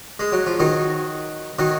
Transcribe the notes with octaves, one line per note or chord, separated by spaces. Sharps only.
G#3
F#3
F3
D#3 F#3
D#3 F#3